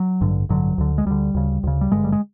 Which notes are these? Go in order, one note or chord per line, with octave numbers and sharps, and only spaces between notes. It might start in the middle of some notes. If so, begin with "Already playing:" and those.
Already playing: F#3
A1 G2 D3
A1 G2 D3 F#3
D2 D3
G#3
D2 D3 G3
D2 C#3
D2 C#3
G3
G#1 G2 D3 G#3
G3
G#3